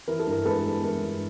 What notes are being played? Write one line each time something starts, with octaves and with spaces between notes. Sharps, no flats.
E3 A#4
A4
G2 A#4
G#3 A4 B4
B3
E3 A#4
G2